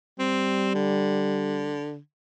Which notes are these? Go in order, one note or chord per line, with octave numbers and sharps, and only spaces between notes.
G3 C4
D3